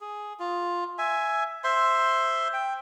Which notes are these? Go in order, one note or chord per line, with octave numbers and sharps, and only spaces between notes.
G#4
F4
E5 G#5
C5 E5 C6
G5